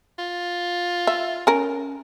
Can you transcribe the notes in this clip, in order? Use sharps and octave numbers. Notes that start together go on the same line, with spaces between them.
F4
E5
C#4 A#4